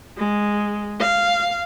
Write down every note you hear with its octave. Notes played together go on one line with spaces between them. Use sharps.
G#3
F5